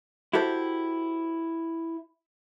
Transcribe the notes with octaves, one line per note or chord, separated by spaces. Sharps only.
E4 F#4 G4 A4 C5